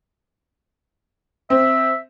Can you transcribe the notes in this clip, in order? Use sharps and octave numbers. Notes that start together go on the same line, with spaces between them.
C4 E5